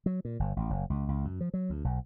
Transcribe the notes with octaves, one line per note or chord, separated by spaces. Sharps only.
F#3
A#2
G1
A1
F#1
C#2
C#2
F#2
F3
F#3
D2
B1